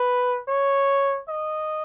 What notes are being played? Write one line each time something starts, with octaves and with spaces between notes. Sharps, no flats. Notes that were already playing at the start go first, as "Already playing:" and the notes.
Already playing: B4
C#5
D#5